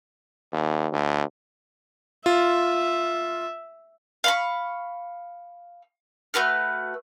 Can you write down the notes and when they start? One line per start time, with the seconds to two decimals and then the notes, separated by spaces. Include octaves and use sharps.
0.53 D#2
0.92 D2
2.26 F4 E5
4.24 F5 B5 C#6
6.34 A3 F#4 B4 F6